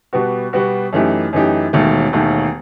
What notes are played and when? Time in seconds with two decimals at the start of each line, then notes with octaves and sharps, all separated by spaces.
0.13 B2 G3 B3 F#4
0.53 B2 G3 B3 F#4
0.93 F#2 E3 A3 D#4 G4
1.33 F#2 E3 A3 D#4 G4
1.73 E1 D#2 D#3 A3
2.13 E1 D#2 D#3 A3